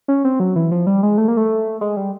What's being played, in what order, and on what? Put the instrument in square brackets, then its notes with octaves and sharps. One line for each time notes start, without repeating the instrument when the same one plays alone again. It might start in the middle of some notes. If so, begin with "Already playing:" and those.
[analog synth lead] C#4
C4
F#3
E3
F3
G3
G#3
A3
A#3
A3
G#3
G3